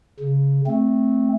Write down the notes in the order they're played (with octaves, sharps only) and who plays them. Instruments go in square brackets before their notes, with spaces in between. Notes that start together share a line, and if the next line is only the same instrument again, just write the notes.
[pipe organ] C#3
A3 C4